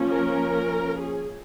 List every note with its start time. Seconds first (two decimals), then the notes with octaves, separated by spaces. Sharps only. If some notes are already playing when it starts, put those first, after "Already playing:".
Already playing: F3 A#3 C#4
0.11 A#4
1.00 G#4